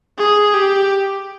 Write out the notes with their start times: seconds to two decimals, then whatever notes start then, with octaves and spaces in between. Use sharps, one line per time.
0.18 G#4
0.54 G4